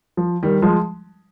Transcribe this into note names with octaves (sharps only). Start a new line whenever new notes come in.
F3
D#3 G3
F3 G#3